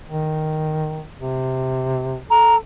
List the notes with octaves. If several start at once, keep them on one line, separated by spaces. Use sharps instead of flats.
D#3
C3
A4 A#5